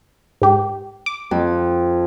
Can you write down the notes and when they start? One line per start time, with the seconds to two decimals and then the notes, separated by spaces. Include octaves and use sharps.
0.42 G#2 G4
1.06 D6
1.31 F2